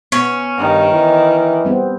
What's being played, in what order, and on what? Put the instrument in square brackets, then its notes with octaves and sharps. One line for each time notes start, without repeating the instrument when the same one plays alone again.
[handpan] B3 [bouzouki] C#4
[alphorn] G2 [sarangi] D#3
[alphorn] E3
[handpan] G3 B3 C4